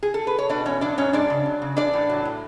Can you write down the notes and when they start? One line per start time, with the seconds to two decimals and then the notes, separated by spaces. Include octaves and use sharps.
0.03 G#4
0.14 A4
0.27 B4
0.38 C#5
0.49 B2 D4 D5
0.66 E2 C#4 C#5
0.81 F#3 D4 D5
0.98 G#2 C#4 C#5
1.13 G#3 D4 D5
1.30 C#3
1.46 F#3
1.62 C#3
1.77 E3 D4 D5
1.93 A2
2.10 F#3
2.25 A2